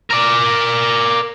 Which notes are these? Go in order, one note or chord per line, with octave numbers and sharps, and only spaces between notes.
A#4 D5